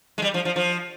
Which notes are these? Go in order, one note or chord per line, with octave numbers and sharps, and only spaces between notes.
G#3
G3
F3
F3
F3